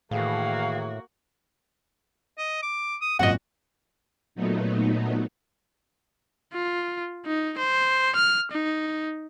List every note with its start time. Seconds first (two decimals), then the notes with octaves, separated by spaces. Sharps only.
0.11 A2 D#3 E3 A#3 F#4 G#4 F5
2.38 D#5
2.62 D6
3.01 D#6
3.19 G#1 F#2 A#2 F#4 D#5 F#5
4.35 A#2 F#3 A3 B3 D#4
6.53 F4
7.26 D#4
7.58 C5
8.16 F6
8.52 D#4